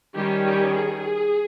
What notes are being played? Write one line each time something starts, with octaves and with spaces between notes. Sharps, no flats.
D#3 G3 C#4 G4
G4
G#4